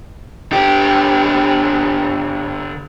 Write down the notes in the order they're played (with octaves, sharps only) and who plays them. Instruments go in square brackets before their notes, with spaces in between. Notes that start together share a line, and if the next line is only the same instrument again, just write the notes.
[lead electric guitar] D3 G4